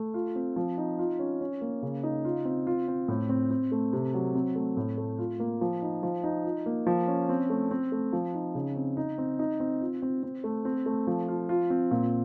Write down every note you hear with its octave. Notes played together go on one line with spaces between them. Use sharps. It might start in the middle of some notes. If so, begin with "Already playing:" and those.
Already playing: A3
F4
C4
F3
D#4
F4
C#4
C#4
A#3
C#3
D#4
F4
C4
F4
C4
A2
C4
C4
A3
C3
F#3
C4
A3
A2
A3
F4
A#3
F3
D#4
F3
D#4
F4
A#3
F3
C#4
C4
A3
C4
A3
F3
D#4
C#3
C4
D#4
C4
D#4
C4
F4
C4
C4
A3
C4
A3
F3
F4
F4
C4
A#2